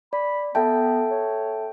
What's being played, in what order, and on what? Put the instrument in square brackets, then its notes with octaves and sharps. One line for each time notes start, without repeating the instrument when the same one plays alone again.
[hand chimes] D5 [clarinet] B5
[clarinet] B3 [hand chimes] A4 E5 A5 [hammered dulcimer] G5
[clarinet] C#5